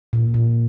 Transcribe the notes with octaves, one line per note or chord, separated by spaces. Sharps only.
A#2
A#2